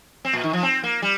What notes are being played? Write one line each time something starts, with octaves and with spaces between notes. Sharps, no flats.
C4
A#2
D#3
F3
C4
A#3
G3